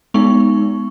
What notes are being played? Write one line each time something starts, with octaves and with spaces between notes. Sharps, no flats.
G#3 B3 D#4 C#6